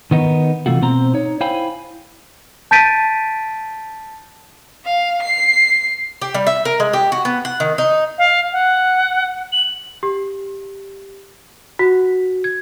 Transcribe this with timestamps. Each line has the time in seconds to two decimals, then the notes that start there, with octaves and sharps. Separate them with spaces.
0.11 D#3 B3 D#4
0.66 C3 E3 A3 F4 F#4
0.82 B2 C4 C5 A#5
1.14 D#4 C#5
1.41 E4 C5 F5 G5 G#5 B5
2.71 A5 G6 A6 B6 D7 D#7
4.85 F5
5.22 C7
6.22 G4
6.34 G3
6.47 E5
6.65 A#4
6.80 G#3
6.93 G4
7.12 F#4
7.25 B3
7.45 F#5
7.60 D#3
7.78 D#4
8.18 F5
8.52 F#5
9.53 F#7
10.03 G4
11.79 F#4
12.44 G#6